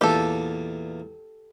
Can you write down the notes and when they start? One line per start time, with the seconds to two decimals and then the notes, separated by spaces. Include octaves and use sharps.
0.01 E2 A#2 G4 A4